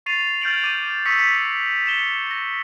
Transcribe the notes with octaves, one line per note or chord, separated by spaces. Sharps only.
C#6 A6 C7 D#7 F7
F6 G6 A6 D7 F7 F#7
D6 D#7
C#6 D#6 E6 A#6 B6 C#7
C#7 E7 G7
A#6